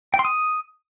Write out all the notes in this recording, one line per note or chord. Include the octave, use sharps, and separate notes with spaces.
G5
C6
D#6